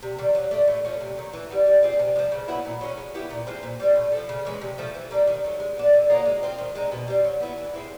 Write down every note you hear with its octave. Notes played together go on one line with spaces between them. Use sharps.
C3
D#3 G3
F#3
A3 D4
A2
F3 A3 C#4
C3
D#3 F#3
E3
G3 B3
G3
C4 F4 G#4
C3
G#3
F3
C#3
F#3 B3 E4
A#2
F#3 A#3 C#4
G#3
B3 E4 G4
A#2
F3 G#3 C4
A#2
G3 C4
A2
F3 A3
C#3
E3 G#3 C#4
C3
F3 A3
E3
G3 A#3 D4
D#3
F#3 A3
G#3
B3 D4
D3
F#3 A#3 D#4
G#3
C4 F4
D#3
G#3 C4 D#4
B2
G3 C4
F#3
B3 E4
E3
G#3 C4 E4